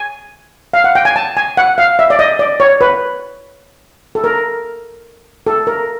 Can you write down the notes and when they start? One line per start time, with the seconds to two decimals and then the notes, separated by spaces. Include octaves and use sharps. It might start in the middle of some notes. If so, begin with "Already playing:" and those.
Already playing: G#5
0.73 F5
0.84 F#5
0.95 G5
1.05 G#5
1.16 A5
1.37 G#5
1.57 F#5
1.78 F5
1.99 E5
2.10 D5
2.19 D#5
2.39 D5
2.60 C#5
2.81 B4
4.15 A4
4.24 A#4
5.47 A4
5.67 A#4